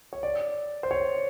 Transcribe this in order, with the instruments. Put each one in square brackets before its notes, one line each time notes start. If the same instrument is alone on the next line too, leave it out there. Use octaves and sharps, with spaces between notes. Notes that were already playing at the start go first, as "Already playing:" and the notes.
[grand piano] C#5
D5
C5
C#5